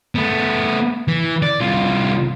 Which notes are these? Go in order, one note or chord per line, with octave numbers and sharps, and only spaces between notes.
A3 B3
E3
D5
C2 F4